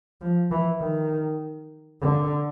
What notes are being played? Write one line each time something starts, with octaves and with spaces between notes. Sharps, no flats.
F3
E3
D#3
D3